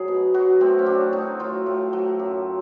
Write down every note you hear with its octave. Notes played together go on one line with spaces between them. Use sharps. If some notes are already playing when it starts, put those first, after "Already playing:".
Already playing: F#3 G#4
B2
F#3 F#4
A2 C4
C#4
F#3 D4
A2 D#4
F#3 F4
A2
F#3
F#2